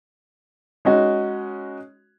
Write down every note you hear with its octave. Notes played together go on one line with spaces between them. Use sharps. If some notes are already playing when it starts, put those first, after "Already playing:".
G#3 C#4 D#4 F#4